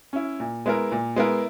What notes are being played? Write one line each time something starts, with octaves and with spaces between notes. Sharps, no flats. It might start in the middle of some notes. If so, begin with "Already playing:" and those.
C#4 E4
A#2
G#3 B3 E4 A#4
A#2
G#3 B3 E4 A#4